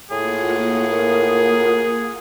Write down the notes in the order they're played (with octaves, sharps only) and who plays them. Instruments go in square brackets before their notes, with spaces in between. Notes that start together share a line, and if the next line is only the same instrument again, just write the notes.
[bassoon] A2 [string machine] A#3 F4 F#5 [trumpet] G#4
[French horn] A#4